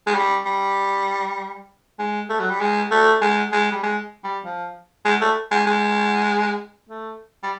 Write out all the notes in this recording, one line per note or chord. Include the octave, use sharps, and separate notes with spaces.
G#3
G3
G3
G#3
A3
F#3
G3
G#3
A3
G#3
G#3
G3
G#3
G3
F3
G#3
A3
G#3
G#3
A3
G3